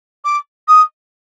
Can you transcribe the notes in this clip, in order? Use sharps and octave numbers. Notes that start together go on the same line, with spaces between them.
D6
D#6